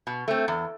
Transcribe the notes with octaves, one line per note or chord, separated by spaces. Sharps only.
B2
A3 C4
E2